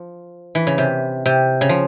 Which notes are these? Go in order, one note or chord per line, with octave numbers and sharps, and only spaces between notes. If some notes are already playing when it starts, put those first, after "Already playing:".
Already playing: F3
E3
C#3
C3
C3
C#3
F3